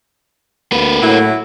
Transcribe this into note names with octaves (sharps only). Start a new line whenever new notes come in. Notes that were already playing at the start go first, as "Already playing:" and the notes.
D2 A#3 B4
A2 F#3 E4